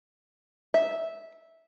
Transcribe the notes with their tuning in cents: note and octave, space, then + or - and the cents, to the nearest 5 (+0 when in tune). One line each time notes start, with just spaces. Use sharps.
E5 -10